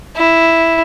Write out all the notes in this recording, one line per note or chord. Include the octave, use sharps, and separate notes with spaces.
E4